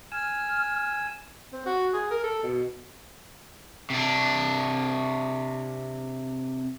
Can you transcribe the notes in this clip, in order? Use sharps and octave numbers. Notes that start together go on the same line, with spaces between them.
G#5 E6 F6
C4
F#4
G#4
A#4
A4
B2
C3 D4